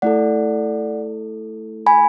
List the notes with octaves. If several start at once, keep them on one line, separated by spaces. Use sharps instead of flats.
A3 E4 A4 D5 F#5
G#5 B5